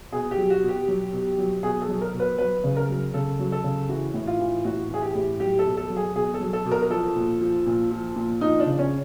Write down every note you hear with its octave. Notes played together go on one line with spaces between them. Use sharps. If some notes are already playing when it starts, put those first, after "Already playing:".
B2 G#4
G4
F#3
F#4
B2
G4
F#3
B2
F#3
B2 G#4
A4
F#3
A#4
B2
B4
F#3 B4
C#3
A#4
F#3
C#3 A4
F#3
A4
C#3
E3 F#4
A2
F4
E3
A2 F#4
E3 G#4
G4
A2
F#3 G4
A4
B2
A4
F#3
G#4
B2 G#4
A4
F#3
A4
B2
A#4
A#4
F3 A4
A#2
F3
A#2
F3
A#2
F3 D#4
D4
C#3
C#4